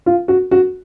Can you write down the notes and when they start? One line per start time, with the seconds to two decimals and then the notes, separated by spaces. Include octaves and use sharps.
0.06 F4
0.28 F#4
0.51 F#4